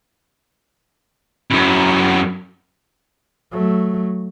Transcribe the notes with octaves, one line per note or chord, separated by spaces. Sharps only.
F#2 E4
F#3 A3